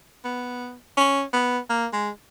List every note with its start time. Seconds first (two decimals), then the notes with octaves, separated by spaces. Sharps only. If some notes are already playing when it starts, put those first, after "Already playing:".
0.24 B3
0.97 C#4
1.33 B3
1.69 A#3
1.93 G#3